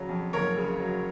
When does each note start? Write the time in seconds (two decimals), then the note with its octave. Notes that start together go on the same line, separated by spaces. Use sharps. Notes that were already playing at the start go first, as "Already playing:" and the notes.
Already playing: C#3 F#3
0.09 F2
0.33 F#1 A#4 C#5
0.57 C#3
0.80 F#3